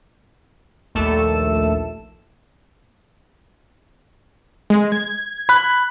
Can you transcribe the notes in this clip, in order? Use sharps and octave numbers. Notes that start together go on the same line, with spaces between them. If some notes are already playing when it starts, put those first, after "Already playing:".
A#1 D#2 A3 A4 E7
G#3
G#6
B5 F#6